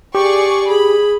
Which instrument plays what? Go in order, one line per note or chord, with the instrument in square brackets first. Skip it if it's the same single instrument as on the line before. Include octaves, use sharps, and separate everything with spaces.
[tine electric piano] G4 [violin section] G#4 D5 C#6
[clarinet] G#4 [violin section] B5